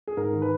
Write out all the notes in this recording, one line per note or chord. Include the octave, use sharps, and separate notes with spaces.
G#4
G#2 A#4
D#3
B4